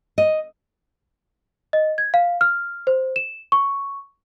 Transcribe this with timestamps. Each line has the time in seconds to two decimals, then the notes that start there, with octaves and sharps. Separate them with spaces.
0.18 D#5
1.73 D#5
1.98 G#6
2.14 F5
2.41 F6
2.87 C5
3.16 E7
3.52 C#6